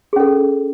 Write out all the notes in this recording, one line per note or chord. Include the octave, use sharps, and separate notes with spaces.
C#4 G#4 A4